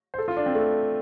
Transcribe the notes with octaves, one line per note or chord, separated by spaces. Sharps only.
C5
A4
F4
D4
C4
A3